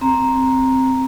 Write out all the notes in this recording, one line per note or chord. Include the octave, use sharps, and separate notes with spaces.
C4 A#5